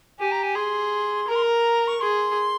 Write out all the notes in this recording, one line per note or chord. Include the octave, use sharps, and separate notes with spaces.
G4 G#5
A#5
G#5
G#4 C6
A#4 A#5
C6
A#5
C#6
G#4 C6